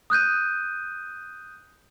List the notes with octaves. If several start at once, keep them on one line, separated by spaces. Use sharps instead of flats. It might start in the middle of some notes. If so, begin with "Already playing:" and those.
D#6 F#6 G6 D#7